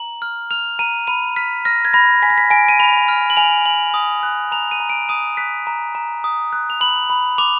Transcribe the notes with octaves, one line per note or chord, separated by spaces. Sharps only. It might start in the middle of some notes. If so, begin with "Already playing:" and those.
Already playing: A#5 F#7
F6
F6 F7
A#5 D#7
B5 D#7
F6 B6
F6 A#6
G#6
B5 A#6
G#5 B6
A#6
B6
G#5 D7
D#7
B5 F7
F6
F#7
G#5 F7
G#5 F#7
D#6
F#6
A#5 F7
D#7
A#5
D7
D#6 D#7
F#6 B6
A#5
A#5
D#6
F#6
F7
B5 F#7
B5
D6 F7